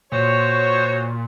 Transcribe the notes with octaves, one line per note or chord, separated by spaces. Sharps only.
A#2 F#4 C5 C#5